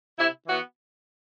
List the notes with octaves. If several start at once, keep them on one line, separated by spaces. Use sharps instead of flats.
C3 E4
E3 B3 F#4